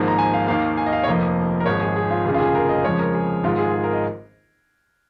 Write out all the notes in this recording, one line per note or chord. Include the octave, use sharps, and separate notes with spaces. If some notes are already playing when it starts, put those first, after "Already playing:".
Already playing: G#1 G#2 F3 A#3
A#5
G#5
F5
D#2 D#3 A#3 F5
G#5
D#5
F5
C#5
F1 F2 F3 A#3 D#5
A#4
G#1 G#2 F3 G#3 C#5
G#4
G#4
F4
F1 D#2 C#3 G#4
F4
G#4
A#4
D#5
F2 C#3 F3 G#3 C#5
A#4
G#4
G#1 G#2 D#3 G#3 F4
G#4
G#4
A#4
D#5